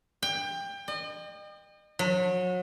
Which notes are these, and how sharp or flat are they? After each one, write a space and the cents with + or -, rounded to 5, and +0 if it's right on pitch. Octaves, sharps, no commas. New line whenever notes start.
G5 +25
D#5 -40
F#3 -30